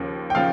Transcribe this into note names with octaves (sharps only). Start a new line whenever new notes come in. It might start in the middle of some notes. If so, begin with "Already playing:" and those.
Already playing: D#2 C#3 F3
G5
C#3 F3 F5